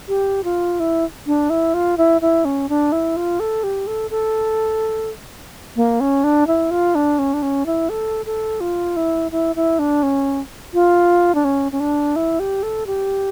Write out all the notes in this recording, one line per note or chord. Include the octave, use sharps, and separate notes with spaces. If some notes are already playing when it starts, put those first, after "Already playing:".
G4
F4
E4
D4
E4
F4
E4
E4
C#4
D4
E4
F4
A4
G4
A4
A4
A#3
C#4
D4
E4
F4
D4
C#4
D4
C#4
E4
A4
A4
F4
E4
E4
E4
D4
C#4
F4
D4
C#4
C#4
D4
E4
G4
A4
G4